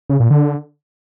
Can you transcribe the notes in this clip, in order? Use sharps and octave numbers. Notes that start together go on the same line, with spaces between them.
C#3
A#2
D3